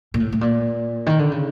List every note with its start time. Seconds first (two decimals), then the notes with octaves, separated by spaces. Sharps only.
0.14 A#2
0.20 A2
0.32 A2
0.41 A#2
1.06 D#3
1.19 D3
1.32 C#3